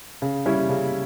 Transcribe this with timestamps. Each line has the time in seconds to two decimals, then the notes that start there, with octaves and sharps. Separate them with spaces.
0.22 C#3
0.46 G3 C#4 E4
0.69 C#3